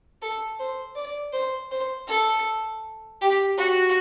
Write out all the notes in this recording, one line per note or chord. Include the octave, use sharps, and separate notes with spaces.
A4
C5
D5
C5
C5
A4
G4
F#4